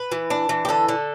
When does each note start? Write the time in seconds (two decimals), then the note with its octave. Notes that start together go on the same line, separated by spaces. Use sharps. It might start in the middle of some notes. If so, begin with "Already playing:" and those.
Already playing: B4
0.12 E3
0.30 D4
0.49 E3
0.65 G4
0.69 D3 A4
0.89 D3